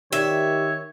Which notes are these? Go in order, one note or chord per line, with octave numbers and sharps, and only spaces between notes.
D#3 G4 C#5 E5